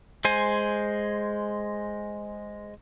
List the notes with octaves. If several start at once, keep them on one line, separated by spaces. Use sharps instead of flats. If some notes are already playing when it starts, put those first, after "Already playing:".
G#3 C5 G#5